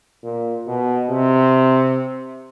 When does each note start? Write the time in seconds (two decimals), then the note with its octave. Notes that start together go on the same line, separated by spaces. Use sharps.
0.24 A#2
0.67 B2
1.10 C3